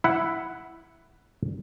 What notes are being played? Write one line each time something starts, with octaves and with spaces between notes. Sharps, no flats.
E4 F#5